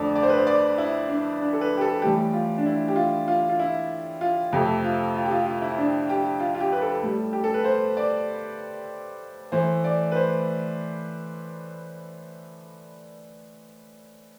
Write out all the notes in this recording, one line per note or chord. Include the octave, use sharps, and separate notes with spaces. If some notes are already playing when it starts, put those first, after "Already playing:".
Already playing: F2 D3 A3 D5
D5
C5
B4
C5
D5
E4
D4
D4
A4
B4
G4
A4
A2 E3 G3 G4
F4
D4
E4
G4
F4
F4
F4
E4
F4
F2 C3 F3 A3 G4
F4
F4
G4
F4
F4
E4
D4
G4
F4
F4
G4
B4
A4
A2 G3
G4
A4
B4
C5
D5
A2 E3 A3 C5
D5
B4
C5